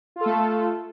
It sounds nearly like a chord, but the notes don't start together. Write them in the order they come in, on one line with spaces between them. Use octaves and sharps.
F4 A4 A3